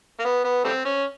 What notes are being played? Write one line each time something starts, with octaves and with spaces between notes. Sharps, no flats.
A#3
B3
B3
G3 A3 C4
C#4